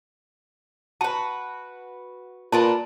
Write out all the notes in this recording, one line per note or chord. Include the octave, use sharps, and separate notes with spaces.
F#4 B4 A5
A#2 D4 A#4 B4 A5